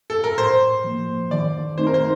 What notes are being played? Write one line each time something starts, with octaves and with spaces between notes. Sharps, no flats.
A4
A#4
A2 C5
F3 A#3
D#3 D5
A3 C4 D#4 C5
A#4
C5